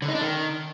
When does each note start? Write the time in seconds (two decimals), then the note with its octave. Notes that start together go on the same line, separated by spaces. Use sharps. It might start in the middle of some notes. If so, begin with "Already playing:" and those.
0.02 D3
0.08 D#4
0.15 D4
0.21 D#3